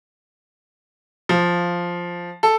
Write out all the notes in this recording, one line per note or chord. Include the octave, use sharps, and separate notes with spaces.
F3
A4